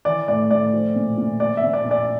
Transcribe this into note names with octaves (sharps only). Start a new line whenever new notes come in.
E3 D5
A2 D5
A2 D5
F3
A#2
A#2
F3 D5
E5
A#2
D5
A#2
D5